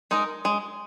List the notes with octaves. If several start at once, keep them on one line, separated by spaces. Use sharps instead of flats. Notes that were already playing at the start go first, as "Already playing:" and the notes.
G#3 D#4 A#4
G#3